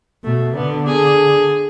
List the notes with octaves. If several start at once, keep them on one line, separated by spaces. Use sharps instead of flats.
B2 A3
D3 B3
G#4